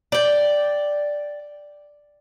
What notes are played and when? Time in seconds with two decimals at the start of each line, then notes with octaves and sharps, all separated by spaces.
0.12 D5 G5